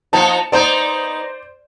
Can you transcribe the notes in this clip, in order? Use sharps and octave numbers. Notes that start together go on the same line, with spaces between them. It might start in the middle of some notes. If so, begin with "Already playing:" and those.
F3 B3 D#4 A5 C#7
B3 D#4 C5 D5